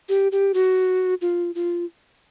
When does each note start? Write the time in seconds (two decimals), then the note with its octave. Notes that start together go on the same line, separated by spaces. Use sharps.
0.09 G4
0.32 G4
0.54 F#4
1.22 F4
1.55 F4